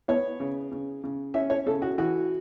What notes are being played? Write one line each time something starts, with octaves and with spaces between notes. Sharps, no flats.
B3 C#5
C#3
C#3
C#3
C#4 E5
C#5
C#3 A4
F#4
E3 F#4